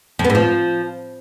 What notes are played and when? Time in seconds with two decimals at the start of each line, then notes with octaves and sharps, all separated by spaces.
0.19 F2
0.24 B3
0.30 G#2
0.35 F3